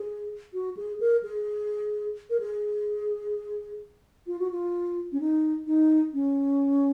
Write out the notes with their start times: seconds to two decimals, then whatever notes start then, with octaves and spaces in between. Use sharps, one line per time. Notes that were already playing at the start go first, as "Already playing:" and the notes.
Already playing: G#4
0.53 F#4
0.77 G#4
1.00 A#4
1.23 G#4
2.30 A#4
2.40 G#4
4.27 F4
4.39 F#4
4.51 F4
5.12 C#4
5.20 D#4
5.67 D#4
6.13 C#4